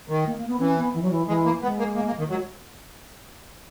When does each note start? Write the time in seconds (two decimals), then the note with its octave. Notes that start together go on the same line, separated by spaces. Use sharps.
0.09 D#3
0.26 A#3
0.37 A#3
0.48 B3
0.60 E3 C#4
0.77 B3
0.94 E3
1.02 F#3
1.11 E3
1.28 E3 G#3
1.45 A#3
1.62 G#3 B3
1.79 A#3
1.96 A#3
2.07 A#3
2.19 D#3
2.30 F#3 G#3